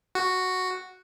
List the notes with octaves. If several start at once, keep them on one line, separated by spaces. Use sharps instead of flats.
F#4